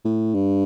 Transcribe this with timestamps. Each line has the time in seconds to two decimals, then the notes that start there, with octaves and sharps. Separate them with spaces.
0.05 A2
0.34 G2